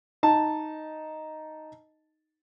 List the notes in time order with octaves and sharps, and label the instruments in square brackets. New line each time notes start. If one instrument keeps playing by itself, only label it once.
[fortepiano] D#4 A5